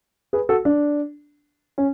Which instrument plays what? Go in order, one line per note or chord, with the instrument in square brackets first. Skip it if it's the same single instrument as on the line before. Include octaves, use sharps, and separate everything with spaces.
[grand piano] G#4 B4
F#4 A4
D4
C#4